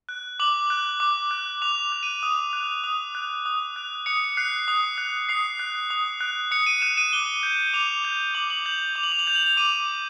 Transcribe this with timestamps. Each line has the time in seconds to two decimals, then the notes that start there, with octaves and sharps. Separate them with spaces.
0.09 F#6
0.40 D6 F#7
0.70 F#6
1.00 D6
1.31 F#6
1.62 D6 F7
1.92 F#6
2.03 D#7
2.23 D#6
2.53 F#6
2.84 D#6
3.15 F#6
3.46 D#6
3.76 F#6
4.06 D#6 C#7
4.37 F#6 C7
4.68 D#6
4.98 F#6
5.29 D#6 C7
5.59 F#6
5.90 D#6
6.21 F#6
6.51 D#6 C#7
6.66 D#7
6.82 F#6 E7
6.97 D#7
7.13 D6 G7
7.43 G6
7.74 D6 F7
8.05 G6
8.34 D6 F#7
8.50 F#7
8.66 G6 F#7
8.96 D6 F7
9.03 F#7
9.12 F7
9.19 F#7
9.27 G6 F7
9.36 F#7
9.43 F7
9.57 D6 D#7